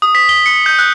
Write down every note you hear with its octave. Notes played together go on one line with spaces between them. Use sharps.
D#6
B6
G7
C#7
G6
F#6